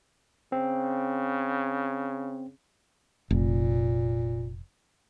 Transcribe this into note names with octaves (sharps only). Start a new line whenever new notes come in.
C#3 C4
F1 A#2